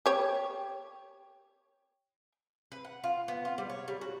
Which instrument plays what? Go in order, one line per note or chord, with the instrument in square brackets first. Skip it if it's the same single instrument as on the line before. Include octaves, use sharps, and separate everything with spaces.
[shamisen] G4 C#5
[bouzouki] B4
F#5
F4
B3
F4
G3
C#5
G3
F#4